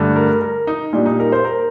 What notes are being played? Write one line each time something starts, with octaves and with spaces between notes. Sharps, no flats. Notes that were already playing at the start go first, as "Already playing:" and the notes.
Already playing: G2 D3 A3
A#4
A#4
D#4
A#2 G3 D4
D#4
A#4
C5
A#4